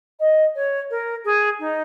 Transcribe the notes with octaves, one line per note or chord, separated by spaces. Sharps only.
D#5
C#5
A#4
G#4
D#4